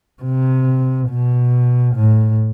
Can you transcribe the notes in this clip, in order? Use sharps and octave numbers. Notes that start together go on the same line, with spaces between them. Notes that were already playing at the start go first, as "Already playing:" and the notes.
C3
B2
A2